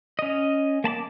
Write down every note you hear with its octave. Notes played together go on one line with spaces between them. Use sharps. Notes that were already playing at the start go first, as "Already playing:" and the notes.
C#4 D#5
A#3 A5 B5 D6